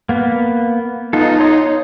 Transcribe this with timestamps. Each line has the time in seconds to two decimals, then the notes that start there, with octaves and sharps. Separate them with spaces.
0.09 A#3 B3
1.13 B3 D#4 F4 A4
1.40 C#5 C6 D#6